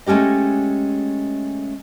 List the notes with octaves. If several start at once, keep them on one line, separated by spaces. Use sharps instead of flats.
G#3 A3 C#4 G4 D#5